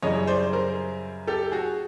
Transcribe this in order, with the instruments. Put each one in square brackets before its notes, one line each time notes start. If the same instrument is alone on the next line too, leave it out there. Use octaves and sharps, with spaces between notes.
[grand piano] F#2 C#3 E3 G3 C#5 D#5
C5 D5
A#4 C5
G4 A4
F#4 G#4